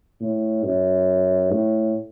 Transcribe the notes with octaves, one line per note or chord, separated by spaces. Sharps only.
A2
F#2
A2